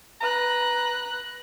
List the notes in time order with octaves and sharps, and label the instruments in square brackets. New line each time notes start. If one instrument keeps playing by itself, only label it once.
[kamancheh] B4 F#6 [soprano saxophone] A#5